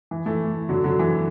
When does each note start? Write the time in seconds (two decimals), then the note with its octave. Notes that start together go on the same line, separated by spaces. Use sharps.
0.11 E3
0.26 E3 A3
0.69 D3 F#3
0.84 D3 F#3
0.99 E3